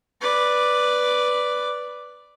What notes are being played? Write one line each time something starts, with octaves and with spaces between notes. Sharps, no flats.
B4 D5